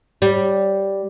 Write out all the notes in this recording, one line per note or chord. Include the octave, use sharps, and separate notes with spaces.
G3